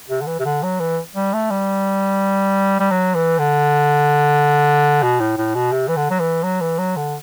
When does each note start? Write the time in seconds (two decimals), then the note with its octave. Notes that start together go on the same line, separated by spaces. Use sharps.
0.10 C3
0.21 D3
0.27 E3
0.39 C3
0.45 D3
0.63 F#3
0.80 E3
1.16 G3
1.33 A3
1.50 G3
2.80 G3
2.91 F#3
3.15 E3
3.38 D3
5.02 B2
5.20 A2
5.37 A2
5.55 B2
5.72 C3
5.88 E3
5.96 D3
6.10 F#3
6.19 E3
6.43 F#3
6.61 E3
6.78 F#3
6.96 D3